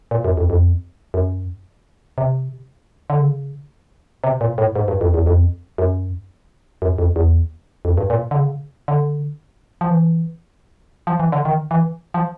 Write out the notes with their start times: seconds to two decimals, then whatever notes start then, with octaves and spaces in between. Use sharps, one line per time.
0.11 A#2
0.25 F#2
0.37 F2
0.50 F2
1.14 F#2
2.18 C3
3.10 D3
3.21 C#3
4.24 C3
4.41 A#2
4.58 A2
4.76 G#2
4.88 G2
5.01 F2
5.14 E2
5.26 F2
5.78 F#2
6.82 F#2
6.98 F2
7.16 E2
7.85 F2
7.98 G2
8.10 A#2
8.31 D3
8.36 C#3
8.88 D3
9.81 F3
9.90 E3
11.07 F3
11.20 E3
11.32 D3
11.45 D#3
11.71 E3
12.14 F3